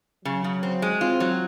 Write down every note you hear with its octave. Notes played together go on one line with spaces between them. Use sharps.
C#3 F#3
C#3
C4
G#3
C4 F4
F#3